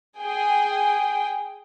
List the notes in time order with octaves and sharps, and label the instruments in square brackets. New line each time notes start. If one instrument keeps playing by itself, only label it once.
[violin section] G#4 G5